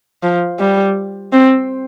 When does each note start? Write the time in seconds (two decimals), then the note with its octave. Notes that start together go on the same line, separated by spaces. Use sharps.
0.23 F3
0.59 G3
1.33 C4